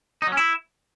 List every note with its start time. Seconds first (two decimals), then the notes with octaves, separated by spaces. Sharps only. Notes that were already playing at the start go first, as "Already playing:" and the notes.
0.22 D#4
0.27 F#3
0.32 C#4
0.37 E4